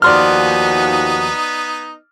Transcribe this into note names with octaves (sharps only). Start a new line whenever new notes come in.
D#2 F3 B3 D#4 F#4 D5 C6 F6